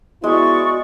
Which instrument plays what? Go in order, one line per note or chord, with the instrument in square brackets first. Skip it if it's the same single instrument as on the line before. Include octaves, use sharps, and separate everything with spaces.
[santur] G#3 [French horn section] B3 E4 [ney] F#4 [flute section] D5 C#6